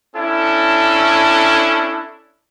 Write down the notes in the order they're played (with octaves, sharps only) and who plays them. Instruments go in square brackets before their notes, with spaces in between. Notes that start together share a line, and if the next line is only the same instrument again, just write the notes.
[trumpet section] C#4 D4 E4 A4